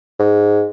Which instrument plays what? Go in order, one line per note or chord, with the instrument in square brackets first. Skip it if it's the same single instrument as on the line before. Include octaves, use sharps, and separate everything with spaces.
[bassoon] G#2